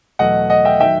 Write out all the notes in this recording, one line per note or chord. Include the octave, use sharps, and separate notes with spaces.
E2 B2 F#3 A3 D#5 F#5
D#5 F#5
E5 G5
D#3 F#3 E5 G5